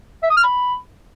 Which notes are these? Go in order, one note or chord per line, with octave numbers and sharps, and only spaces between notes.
E5
D#6
F6
B5